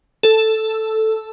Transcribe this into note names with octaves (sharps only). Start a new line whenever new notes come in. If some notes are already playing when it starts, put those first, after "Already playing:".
A4